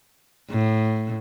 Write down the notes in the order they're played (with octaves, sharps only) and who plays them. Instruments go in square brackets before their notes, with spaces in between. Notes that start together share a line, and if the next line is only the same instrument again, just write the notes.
[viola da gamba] A2